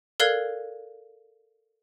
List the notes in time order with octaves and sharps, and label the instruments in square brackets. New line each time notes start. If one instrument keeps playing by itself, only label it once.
[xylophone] A4 A#4 D5 F5 F#6 G#6